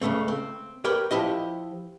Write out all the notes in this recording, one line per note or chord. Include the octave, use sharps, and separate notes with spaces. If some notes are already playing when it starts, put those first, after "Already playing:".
C#2 G#2 C#3 A3 C4
C4
G4 A#4 B4 C#5 G5
F3 E4 G4 D#5